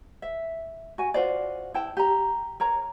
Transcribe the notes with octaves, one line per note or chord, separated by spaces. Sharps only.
E5
F#4 G#5
F4 F#4 C5 D5
E4 G5 A5
G4 A#5
A#4 C#5 A#5